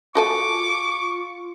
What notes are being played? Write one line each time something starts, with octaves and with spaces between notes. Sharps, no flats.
F4 F#4 A4 G#5 C#6 D6